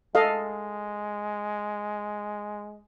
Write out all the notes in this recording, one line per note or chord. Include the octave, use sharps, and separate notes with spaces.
G#3 A4 D#5 F5